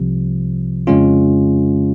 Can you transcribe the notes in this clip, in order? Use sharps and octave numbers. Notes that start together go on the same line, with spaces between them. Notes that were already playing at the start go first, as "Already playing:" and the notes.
Already playing: C2 C3 F3
F2 C#3 G#3 C#4 F4